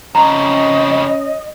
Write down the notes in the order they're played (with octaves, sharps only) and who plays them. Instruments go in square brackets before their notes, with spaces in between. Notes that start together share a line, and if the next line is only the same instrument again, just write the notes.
[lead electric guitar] F2 C#3 [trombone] C#4 [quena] D#5 [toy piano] A#5